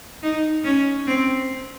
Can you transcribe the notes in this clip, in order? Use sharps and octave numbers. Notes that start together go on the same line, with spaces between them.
D#4
C#4
C4